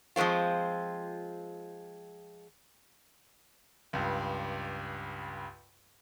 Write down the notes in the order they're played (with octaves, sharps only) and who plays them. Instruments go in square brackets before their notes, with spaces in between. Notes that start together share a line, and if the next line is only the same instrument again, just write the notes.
[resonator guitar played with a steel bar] F3 G#3 A#3 C4 F4
[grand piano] C#2 G2